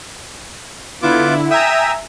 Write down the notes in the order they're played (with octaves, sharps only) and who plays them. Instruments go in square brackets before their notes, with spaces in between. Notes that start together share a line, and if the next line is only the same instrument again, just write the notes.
[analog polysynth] D3 E4 [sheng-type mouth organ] B3 F4 D6
[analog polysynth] E5 G#5 A#5 [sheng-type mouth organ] G5 D#6 E6